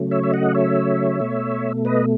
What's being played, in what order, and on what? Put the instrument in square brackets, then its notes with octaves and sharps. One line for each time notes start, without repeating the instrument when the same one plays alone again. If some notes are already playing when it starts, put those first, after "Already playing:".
Already playing: [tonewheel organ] C#3 F#3 A3
C#5 E5
E5
D#5 F#5
C#5 E5
B2 A3
B4 D#5